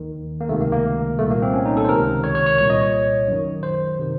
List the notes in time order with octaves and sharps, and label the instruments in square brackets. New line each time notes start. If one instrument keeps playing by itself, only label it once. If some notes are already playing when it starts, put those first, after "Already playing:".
Already playing: [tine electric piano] D#2 D#3
A#3
C#2 C3 D#3 A3
A#3
A#3
C2 A#2 A3
A#3
C4
C#4
D#4
A4
C5
C#2 C3 D#3 A#4
C#5
C#5
C#5
C2 A#2 C#5
D#5
C#5
F#2 D#3
C5
C3 D#3